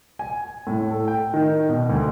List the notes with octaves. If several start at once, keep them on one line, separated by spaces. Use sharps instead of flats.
G#5
A2
A4
G5
D#3
B2
D2